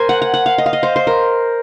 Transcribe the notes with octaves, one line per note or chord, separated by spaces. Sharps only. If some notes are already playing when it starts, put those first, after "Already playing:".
Already playing: A#4 C5 G#5
F#5
F#5
F#5
F5
D#5
F5
D#5
C5
C5
A#4